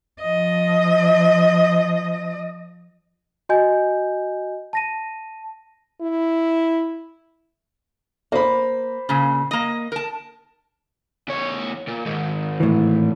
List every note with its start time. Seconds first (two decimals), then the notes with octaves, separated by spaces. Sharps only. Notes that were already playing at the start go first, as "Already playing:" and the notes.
0.21 F3 D#5
3.49 F#4 D#5 G#5 G6
4.73 A5 A#6 D#7
6.01 E4
8.32 A#3 C5 B5
9.09 A#2 C#3
9.51 A#3 D#5
9.92 A#4 A5
11.28 E2 C#5
11.87 A#2
12.06 G#2 D#3
12.60 A2 E3